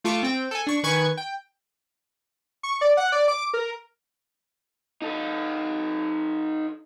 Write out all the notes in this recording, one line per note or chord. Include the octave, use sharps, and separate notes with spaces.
A3 F4 A4 C#6 D6
C4 G5
A4 G#5
D4 C#6
D#3 B4 G#5 C#6 G#6
G5
C#6
D5
F#5
D5
D6
A#4
D#4 A4